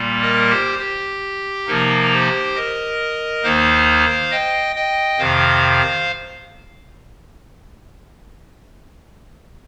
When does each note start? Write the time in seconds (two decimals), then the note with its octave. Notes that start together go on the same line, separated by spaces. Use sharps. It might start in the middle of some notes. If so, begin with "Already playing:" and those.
Already playing: A#2 G3 A#3
0.21 A#4 D#5
0.50 G4 C5
0.79 G4
1.67 C3 F3 A#3 D#4 A#4
2.12 G4 C5
2.55 A#4 D#5
3.44 D#2 D#3 A#3 D#4 C5 F5
4.31 D#5 G5
4.76 D#5 G5
5.19 F2 C3 D#3 C5 F5